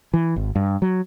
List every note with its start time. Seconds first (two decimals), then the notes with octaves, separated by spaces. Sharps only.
0.14 E3
0.36 G#1
0.55 G2
0.82 F#3